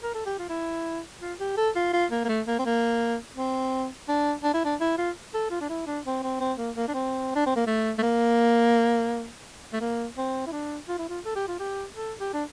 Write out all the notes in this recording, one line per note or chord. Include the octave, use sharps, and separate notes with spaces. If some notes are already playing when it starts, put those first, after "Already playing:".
A#4
A4
G4
F4
E4
F4
G4
A4
F4
F4
A#3
A#3
A3
A#3
C4
A#3
C4
D4
D4
E4
D4
E4
F4
A4
F4
D4
E4
D4
C4
C4
C4
A#3
A#3
D4
C4
D4
C4
A#3
A3
A3
A#3
A3
A#3
C4
E4
D4
F4
E4
F4
A4
G4
F4
G4
A4
G4
D4